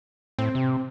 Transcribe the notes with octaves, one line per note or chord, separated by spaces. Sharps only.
A2 C4
C3